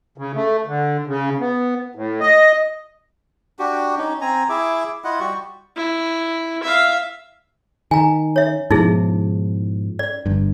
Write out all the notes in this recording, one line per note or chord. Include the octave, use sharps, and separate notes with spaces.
C#3
A3
D3
C#3
B3
A2
D#5
D4 F#4 G4
C#4 D#4
C4 G#5 A#5
E4 G#4 E5 D6
E4 F4 D#5 F#5
G3 F#4 G4 C#6
E4
E5 F5
D#3 G#5 A#5
C#5 E5
G#2 B2 F3 D#4 E4 G#4
D5
G1 G2